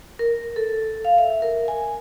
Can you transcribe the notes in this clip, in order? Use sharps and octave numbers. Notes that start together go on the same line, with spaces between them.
A#4
A4
F5
E5
A#4
G#5